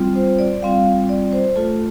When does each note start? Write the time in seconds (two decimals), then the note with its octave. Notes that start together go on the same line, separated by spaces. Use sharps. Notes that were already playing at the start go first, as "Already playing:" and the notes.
Already playing: G3 C4 F4
0.15 C5
0.39 D5
0.62 G3 C4 F4 F5
1.09 D5
1.33 C5
1.56 A3 F4 A4